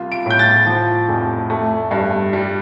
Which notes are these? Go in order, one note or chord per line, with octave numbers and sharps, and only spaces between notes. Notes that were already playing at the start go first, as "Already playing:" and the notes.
Already playing: C2 F4
D7
A2 G6
A6
F3
F1
A3
G2
G3